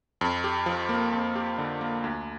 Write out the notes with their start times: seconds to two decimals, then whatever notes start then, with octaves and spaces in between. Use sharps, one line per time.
0.21 F2
0.44 G4
0.66 F3
0.89 A#3
1.13 F2
1.36 G4
1.58 D3
1.81 A#3
2.04 D2